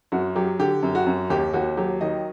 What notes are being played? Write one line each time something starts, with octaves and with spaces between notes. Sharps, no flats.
F#2 F#4
F#3 G4
D3 G4
F#2
F#4
F#2
D#2 G4
D#2 F#4
F#3 G4
D#3 D#5